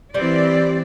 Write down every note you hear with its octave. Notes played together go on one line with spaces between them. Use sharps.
E3 G3 C4 D5